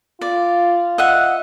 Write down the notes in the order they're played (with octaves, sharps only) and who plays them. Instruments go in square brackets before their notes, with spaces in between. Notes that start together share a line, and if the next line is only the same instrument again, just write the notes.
[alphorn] F4 [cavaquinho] D5
[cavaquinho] D#5 E5 F#5